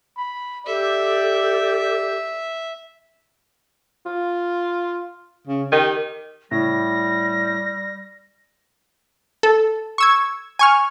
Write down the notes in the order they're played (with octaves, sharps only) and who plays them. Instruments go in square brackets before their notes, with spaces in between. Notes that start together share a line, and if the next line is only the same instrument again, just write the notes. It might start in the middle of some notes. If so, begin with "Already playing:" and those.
[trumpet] B5
[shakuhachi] G4 [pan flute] A4 [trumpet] D5 [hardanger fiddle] E5
[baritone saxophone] F4
C#3
[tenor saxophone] D#3 [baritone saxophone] G4
[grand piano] A2 [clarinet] G3 [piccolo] A#6
[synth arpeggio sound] A4
C#6 E6 G#6
G#5 C#6 F6